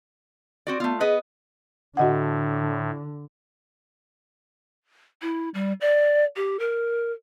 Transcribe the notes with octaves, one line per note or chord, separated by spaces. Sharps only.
C4 F#4 D5
A3 B3 F4
B3 G#4 B4 D#5
A2 D3 F#4 D#5 F#5
E4
G3
D5
G4
A#4